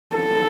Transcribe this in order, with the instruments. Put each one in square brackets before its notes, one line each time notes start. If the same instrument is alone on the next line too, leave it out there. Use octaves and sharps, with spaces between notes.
[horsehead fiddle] A4